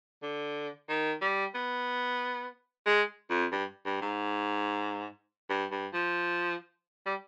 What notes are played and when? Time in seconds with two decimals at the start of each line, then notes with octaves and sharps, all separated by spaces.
0.23 D3
0.89 D#3
1.22 G3
1.55 B3
2.86 G#3
3.30 F2
3.52 G2
3.85 G2
4.02 G#2
5.50 G2
5.71 G2
5.93 F3
7.06 G3